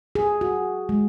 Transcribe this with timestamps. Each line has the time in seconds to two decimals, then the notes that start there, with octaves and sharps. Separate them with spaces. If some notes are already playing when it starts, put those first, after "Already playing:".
0.15 G#4
0.41 F#4
0.89 G#3